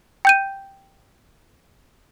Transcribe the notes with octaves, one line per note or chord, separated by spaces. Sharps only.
G5 G6 D#7